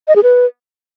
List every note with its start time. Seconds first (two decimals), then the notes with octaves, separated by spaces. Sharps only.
0.08 D#5
0.16 G#4
0.23 B4